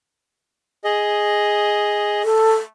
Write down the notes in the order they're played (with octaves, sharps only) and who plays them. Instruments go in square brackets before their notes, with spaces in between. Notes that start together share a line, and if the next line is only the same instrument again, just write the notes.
[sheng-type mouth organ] G#4 D#5
[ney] A4